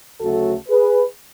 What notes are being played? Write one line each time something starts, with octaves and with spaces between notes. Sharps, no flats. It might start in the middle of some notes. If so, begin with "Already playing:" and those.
D2 C#3 F#3 A3 F#4 A4
G#4 B4